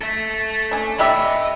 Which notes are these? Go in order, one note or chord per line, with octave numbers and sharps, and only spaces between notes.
A4 E5
C#4 D4
D4 G4 D#5 E5 B5